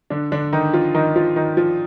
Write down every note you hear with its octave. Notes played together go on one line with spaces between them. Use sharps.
D3 D4
D3 D4
D#3 D#4
F3 F4
D#3 D#4
F3 F4
D#3 D#4
F3 F4